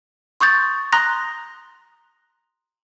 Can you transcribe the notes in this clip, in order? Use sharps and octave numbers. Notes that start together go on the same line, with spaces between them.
C6 C#6 D#6 G6 A6
A#5 C6 D#6 F#6 A#6